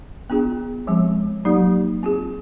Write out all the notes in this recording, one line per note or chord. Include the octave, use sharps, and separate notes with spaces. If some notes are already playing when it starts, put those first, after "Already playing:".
B3 D4 F4 G#4
F3 G#3 C4
F#3 A#3 D#4 G4
C4 F4 G#4